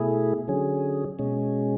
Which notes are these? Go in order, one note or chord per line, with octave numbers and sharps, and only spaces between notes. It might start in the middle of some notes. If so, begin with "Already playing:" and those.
Already playing: B2 A3 E4 G#4
D3 F#3 C#4 G#4
B2 G#3 C#4